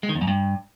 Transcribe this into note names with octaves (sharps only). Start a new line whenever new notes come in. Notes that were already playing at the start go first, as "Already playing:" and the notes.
G#3
D#3
E2
F#2
G2